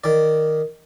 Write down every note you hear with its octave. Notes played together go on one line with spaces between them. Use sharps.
D#3 D5